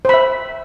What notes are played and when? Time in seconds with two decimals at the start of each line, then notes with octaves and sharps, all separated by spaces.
0.05 C5
0.09 B5
0.14 E5